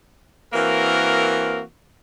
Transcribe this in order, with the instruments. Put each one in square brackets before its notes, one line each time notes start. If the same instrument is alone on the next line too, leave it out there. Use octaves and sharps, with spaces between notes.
[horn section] E3 A#3 C4 F#4 A#4